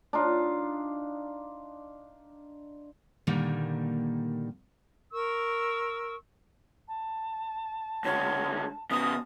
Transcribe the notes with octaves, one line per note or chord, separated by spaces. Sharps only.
D4 D#4 F4
A#2 D3 D#3 G3 A#3
A#4 C#6 E6
A5
C#2 D3 C#5
C#3 B3 D#6